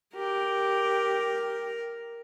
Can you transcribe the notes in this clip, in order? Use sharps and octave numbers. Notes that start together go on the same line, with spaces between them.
G4 A#4